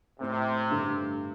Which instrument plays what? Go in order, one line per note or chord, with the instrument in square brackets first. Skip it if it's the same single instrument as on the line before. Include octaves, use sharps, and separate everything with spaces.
[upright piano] A2 A3 C4 [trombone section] C3
[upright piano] G2 D3 A3